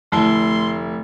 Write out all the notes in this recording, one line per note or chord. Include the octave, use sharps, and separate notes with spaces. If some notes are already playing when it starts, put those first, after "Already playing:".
F1 D3 A3 E4 C6 G7